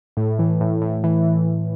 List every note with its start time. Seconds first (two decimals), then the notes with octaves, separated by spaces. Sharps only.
0.17 A2
0.39 E3
0.61 A2
0.81 A2
1.04 E3